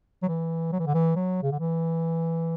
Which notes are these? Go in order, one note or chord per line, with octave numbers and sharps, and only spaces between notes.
F#3
E3
F#3
E3
D3
E3
F#3
C#3
D3
E3